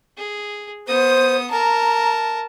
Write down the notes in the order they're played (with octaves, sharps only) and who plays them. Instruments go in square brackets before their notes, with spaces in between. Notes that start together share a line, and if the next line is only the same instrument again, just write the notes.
[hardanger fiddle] G#4
[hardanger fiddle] B3 D#6 [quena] C5
[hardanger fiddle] A#4 A5 [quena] A#5